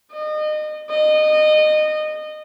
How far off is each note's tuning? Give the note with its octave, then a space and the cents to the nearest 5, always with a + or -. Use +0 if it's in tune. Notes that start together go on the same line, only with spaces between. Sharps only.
D#5 -30
D#5 -20